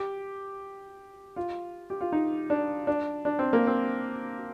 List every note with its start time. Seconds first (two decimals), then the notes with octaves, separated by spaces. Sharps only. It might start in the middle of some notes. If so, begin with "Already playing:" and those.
Already playing: G4
1.36 F4
1.90 G4
2.01 F4
2.12 D#4
2.50 D4
2.87 D4
3.25 D4
3.39 C4
3.53 A#3
3.67 C4